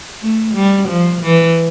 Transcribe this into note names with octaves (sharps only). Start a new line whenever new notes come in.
A3
G3
F3
E3